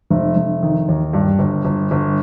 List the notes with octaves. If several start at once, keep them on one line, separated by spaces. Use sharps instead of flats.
F1
F1
D#3
D#2
G2
G1
G1
G1